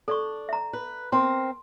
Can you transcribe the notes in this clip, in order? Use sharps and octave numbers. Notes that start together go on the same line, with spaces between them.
D4 A4 D5 C#6
E5 A#5
B4
C4 A#4 C6